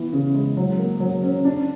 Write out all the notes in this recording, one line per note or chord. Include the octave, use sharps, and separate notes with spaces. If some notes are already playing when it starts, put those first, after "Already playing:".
Already playing: E3 B3
C#3
G#3
F#3
A#3
F#3
C#4
D4